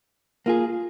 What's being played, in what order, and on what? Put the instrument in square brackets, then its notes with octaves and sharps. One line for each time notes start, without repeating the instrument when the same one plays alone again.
[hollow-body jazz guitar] A#3 F4 G#4